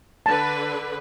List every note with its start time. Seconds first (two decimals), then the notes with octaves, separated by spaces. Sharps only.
0.26 D3 B4 A5